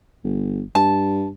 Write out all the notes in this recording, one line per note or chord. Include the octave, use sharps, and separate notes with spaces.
G1
G2 A5